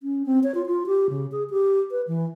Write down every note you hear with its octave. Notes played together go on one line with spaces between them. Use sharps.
C#4
C4
C#5
F4
F4
G4
C#3
G#4
G4
B4
E3